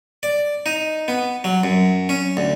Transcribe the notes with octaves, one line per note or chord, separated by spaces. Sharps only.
D5
D#4
B3
F#3
F#2
C#4
D2